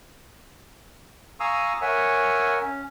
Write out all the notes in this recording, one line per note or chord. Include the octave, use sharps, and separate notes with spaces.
F5 G#5 A#5 C#6 D#6 E6
A#4 C#5 E5 F#5 G#5
C#4